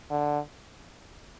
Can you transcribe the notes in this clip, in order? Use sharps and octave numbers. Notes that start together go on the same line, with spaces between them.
D3